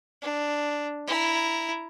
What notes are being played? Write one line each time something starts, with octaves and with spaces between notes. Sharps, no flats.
D4
E4 A#5